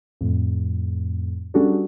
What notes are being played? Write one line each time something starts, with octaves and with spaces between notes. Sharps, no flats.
F2 A2
G3 C#4 D4 F#4 G#4 A4